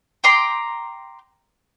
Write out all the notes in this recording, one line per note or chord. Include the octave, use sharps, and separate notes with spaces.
G5 A#5 C6 D6